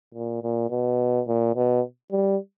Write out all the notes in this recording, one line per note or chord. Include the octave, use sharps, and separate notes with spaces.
A#2
A#2
B2
A#2
B2
G3